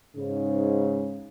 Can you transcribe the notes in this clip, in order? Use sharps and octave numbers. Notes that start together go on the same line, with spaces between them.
G#2 C#3